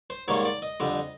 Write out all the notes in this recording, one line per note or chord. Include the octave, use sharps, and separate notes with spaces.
C5
G#2 D#3 G3 A#3 C#5
D5
D#5
F2 D3 G3